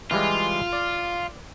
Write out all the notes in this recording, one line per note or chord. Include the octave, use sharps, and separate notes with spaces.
E3 G3 G#3 F4
D5